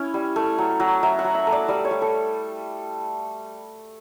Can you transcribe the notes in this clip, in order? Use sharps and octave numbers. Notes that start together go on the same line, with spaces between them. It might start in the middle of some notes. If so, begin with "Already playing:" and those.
Already playing: C#4 E4
G3
A3
F#3
F#3
F#3 E5
F#5
F#3
E5
A3
D5
G3 D5
C#5
G3
A4